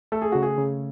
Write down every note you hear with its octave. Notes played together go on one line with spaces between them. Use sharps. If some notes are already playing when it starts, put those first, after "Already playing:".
A3 A4
G#4
C#3 F#4
G#4
C#3